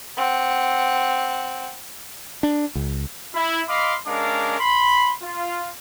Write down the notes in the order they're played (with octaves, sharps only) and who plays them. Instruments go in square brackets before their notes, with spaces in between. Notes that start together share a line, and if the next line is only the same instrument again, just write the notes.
[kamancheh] C4 F#5
[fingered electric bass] D4
C#2
[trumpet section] E4
D#5 F5 B5 C6 D6
G#3 C#4 D4 A#4 F5 D6
B5 C6
F4